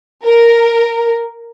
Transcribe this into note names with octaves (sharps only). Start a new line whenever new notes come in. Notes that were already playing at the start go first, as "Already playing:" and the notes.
A#4